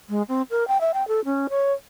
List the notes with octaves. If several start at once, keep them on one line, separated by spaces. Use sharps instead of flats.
G#3
C4
A#4
G5
E5
G5
A4
C#4
C#5